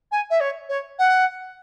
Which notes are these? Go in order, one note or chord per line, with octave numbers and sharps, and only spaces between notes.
G#5
E5
C#5
C#5
F#5